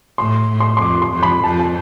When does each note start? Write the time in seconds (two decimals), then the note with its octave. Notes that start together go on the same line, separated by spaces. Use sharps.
0.18 A2 C6
0.51 A2
0.60 C6
0.77 C6
0.81 F2 D6
1.02 C6
1.12 F2
1.23 B5
1.44 F2 A5
1.60 A5